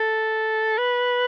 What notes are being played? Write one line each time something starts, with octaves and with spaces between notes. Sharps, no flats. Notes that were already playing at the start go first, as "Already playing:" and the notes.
Already playing: A4
B4